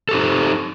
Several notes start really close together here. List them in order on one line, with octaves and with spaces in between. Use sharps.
A4 G4 D#4